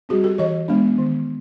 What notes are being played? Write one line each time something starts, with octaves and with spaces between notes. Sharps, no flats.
G3 C4 F#4 G#4
G4 A4
E3 C#5 D#5
G#3 B3 D4
D#3